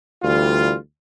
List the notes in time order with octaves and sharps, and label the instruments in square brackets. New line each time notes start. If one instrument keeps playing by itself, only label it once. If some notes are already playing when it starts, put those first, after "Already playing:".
[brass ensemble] D2 E3 G3 F4